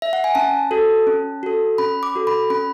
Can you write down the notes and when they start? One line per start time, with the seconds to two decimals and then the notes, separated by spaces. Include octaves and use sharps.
0.02 E5
0.13 F#5
0.24 G#5
0.35 C#4 A5
0.71 F#4 A4
1.07 C#4
1.43 F#4 A4
1.78 C#4 B5
2.03 D6
2.15 F#4 A4
2.27 B5
2.50 C#4 B5